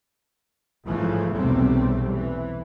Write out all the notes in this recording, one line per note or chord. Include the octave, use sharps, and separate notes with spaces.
A1 G#2 C#3 E3 F3 A3
B1 E2 C3 G3 A3 C4
E3